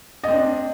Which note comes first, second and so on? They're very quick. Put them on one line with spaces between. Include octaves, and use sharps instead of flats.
D#5 C4 D4